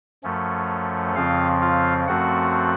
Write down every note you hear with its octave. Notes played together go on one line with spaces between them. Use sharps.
F#2 F3 A3 C#4
F2 C#3 F3 C4 F4 F5
F4 F5
F#2 F3 A3 C4 F#4 F#5